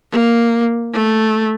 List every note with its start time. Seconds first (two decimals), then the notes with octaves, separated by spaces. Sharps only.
0.11 A#3
0.94 A3